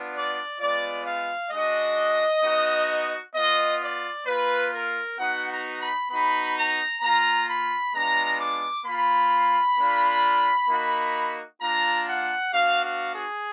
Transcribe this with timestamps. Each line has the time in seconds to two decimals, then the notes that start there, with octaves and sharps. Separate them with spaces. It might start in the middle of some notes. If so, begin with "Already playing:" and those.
Already playing: B3 D4 F4
0.13 D5
0.59 G#3 B3 F4 D5
1.05 F5
1.51 G#3 D4 F#4 D#5
2.43 B3 D#4 F#4
3.34 B3 F4 D#5
3.81 D5
4.26 A#3 F4 B4
4.72 A#4
5.18 B3 D#4 F#4 F#5
5.48 A#5
5.79 B5
6.10 B3 D#4 F#4 B5
6.56 A#5
7.01 A#3 F4 A#5
7.48 B5
7.93 G#3 B3 D4 F4 A#5
8.39 D6
8.85 A#3 F4 B5
9.77 A#3 D4 F4
10.68 A#3 D#4 F#4
11.60 A#3 D4 F4 A#5
12.06 F#5
12.52 B3 D4 F#4 F5
12.83 F5
13.13 G#4